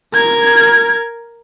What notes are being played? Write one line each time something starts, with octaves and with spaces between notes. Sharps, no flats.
A#4 G#6